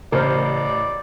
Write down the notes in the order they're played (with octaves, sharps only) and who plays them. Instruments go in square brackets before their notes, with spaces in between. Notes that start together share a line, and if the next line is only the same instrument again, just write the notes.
[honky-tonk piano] A1 [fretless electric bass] C#3 [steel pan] A#4 C5 [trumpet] D5